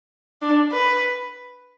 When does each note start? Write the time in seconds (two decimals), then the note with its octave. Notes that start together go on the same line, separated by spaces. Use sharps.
0.42 D4
0.72 B4